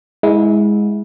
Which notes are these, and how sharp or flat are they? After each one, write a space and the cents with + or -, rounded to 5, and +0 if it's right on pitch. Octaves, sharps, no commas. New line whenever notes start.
G#3 +0 E4 -25 F#5 -45